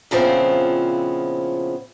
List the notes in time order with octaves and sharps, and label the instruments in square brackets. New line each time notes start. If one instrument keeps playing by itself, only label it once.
[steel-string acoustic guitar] A#2 C#3 F3 B3 C4 E4